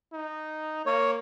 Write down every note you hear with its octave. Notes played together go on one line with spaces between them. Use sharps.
D#4
A#3 C#5